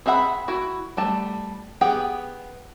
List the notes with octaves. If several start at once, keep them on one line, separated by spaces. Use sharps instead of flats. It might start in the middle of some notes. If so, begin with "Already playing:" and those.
C4 G#4 E5 F#5 B5
E4 F#4
G3 A3 A5
B3 G4 G#4 F#5 G5